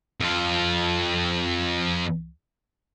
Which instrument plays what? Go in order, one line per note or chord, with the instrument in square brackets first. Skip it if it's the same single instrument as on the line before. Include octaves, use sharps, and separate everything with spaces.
[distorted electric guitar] F2 F4